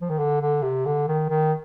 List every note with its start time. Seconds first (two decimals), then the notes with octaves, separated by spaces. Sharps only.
0.01 F3
0.10 D#3
0.19 D3
0.42 D3
0.63 C3
0.86 D3
1.08 D#3
1.29 D#3